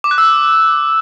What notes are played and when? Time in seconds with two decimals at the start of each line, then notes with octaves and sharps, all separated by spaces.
0.04 D6
0.11 F#6
0.18 E6